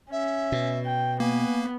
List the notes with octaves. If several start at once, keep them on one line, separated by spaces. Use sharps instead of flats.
C#4 E5
B2
G5
A#3 B3 G#5